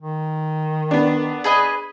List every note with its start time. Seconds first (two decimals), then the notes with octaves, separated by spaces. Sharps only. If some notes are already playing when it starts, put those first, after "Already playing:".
0.01 D#3
0.91 B3 D4
1.44 G#4 B4 D#5